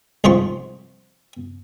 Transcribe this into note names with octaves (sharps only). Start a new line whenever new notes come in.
C2 G#2 F3 C6 C#6